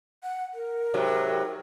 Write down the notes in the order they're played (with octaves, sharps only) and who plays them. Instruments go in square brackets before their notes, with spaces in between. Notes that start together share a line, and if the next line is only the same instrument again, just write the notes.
[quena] F#5
A#4
[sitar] G#2 C3 F#3